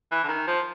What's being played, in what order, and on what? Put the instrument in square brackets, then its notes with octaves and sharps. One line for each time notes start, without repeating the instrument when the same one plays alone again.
[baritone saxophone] E3
D3
D#3
F3